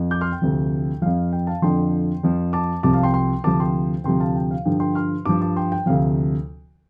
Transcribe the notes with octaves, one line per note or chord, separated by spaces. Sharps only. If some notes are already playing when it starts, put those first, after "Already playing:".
Already playing: F2 F3
D6 G6
C6 F6
G5
D2 C3 F3
F2 F3 F5
G5
F5 A5
F2 D3 F3 G5 C6
F2 F3
A5 D6
C2 C3 F3 A5 D6
F5 A5
G5 C6
G5 C6
D2 C3 F3 A5 D6
G5 C6
D2 C3 F3 G5 C6
F5 A5
G5
F5
G2 D3 F3 G5
G5 C6
C6 F6
G2 F3 A5 D6
A5 D6
G5 C6
G5
D2 C3 F3 F5